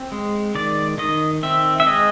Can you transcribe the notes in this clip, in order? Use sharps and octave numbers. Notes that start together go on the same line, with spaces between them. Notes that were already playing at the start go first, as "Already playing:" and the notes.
Already playing: C4
G#3
D#3 D5
D#3 D#5
C4 E5
E5
G#3 D#5